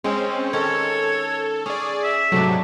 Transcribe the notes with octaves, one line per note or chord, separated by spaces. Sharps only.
G#3 C4 C#4
D#3 C#4 A4 C#5
C#4 G#4 D5
E5
G#2 C3 F#3 A3 D4